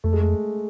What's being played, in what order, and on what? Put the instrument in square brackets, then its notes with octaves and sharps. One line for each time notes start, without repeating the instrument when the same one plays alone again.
[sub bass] F2 [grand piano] A3
[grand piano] G#3
A3